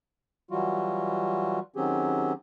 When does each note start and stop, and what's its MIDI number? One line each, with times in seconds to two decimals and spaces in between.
0.51 1.59 52
0.51 1.59 54
0.51 1.59 55
0.51 1.59 65
0.51 1.59 66
1.76 2.33 51
1.76 2.33 54
1.76 2.33 60
1.76 2.33 61
1.76 2.33 67
1.76 2.33 68